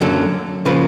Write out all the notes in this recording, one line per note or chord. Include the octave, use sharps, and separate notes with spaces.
F#2 D3 F#3 A#3 A4
C#3 F3 A#3 B4